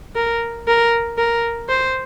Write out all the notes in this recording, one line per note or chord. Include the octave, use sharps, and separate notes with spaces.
A#4
A#4
A#4
C5